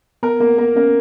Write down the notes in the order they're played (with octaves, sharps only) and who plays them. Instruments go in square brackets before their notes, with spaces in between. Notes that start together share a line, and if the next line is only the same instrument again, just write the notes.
[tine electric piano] B3 [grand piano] A#4
[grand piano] A#3 [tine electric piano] B3
[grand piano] A#3
[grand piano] A#3 [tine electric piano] C#4